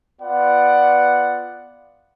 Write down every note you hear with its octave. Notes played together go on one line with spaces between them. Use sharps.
B3 F4 B4 D5 F#5